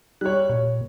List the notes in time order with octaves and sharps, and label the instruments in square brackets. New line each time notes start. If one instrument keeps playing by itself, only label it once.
[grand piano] G3 C#5 [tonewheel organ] F#6
[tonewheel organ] A#2 [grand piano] C#5